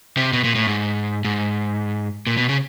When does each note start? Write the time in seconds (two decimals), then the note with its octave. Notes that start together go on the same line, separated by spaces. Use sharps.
0.17 C3
0.33 B2
0.44 A#2
0.55 A2
0.67 G#2
1.25 G#2
2.27 A#2
2.37 B2
2.49 C#3